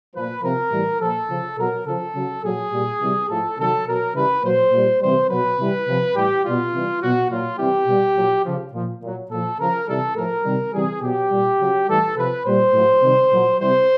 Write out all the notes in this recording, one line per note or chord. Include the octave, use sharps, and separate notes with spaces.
A#2 F3 B4
C3 F3 A#4
A2 E3 G3
A#2 F3 A4
C#3 F3
B2 F#3 A#4
C#3 F3 A4
C#3 F#3
A#2 F#3 G#4
A#2 G3
C3 E3 G3
A2 F3 A4
C3 D#3 F#3 A4
B2 F#3 A#4
C#3 E3 G3 B4
A#2 F#3 C5
A#2 G3
C3 E3 G3 C5
B2 F#3 B4
C3 E3 G3
C3 F3
A2 E3 G3 G4
B2 G3 F4
C3 E3 G3
B2 F#3 F#4
A#2 F#3 F4
C3 E3 G3 G4
B2 G3
A#2 F#3
C#3 F3
A#2 F3
A#2 F#3
A#2 F3 A4
C#3 F3 A#4
C3 E3 G3 A4
A2 F3 A#4
C3 D#3 G3
C3 E3 G3 G#4
B2 F#3 G4
A#2 G3
C#3 F#3
A2 E3 G3 A4
C3 F3 B4
A#2 G3 C5
A2 F#3
C3 D#3 G3
A#2 F#3
C3 E3 G3 C5